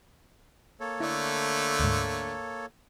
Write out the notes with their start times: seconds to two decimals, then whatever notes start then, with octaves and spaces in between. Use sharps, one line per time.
0.80 A#3 A4 C#5
1.00 D3 A3 E4 D5
1.80 D2 G#2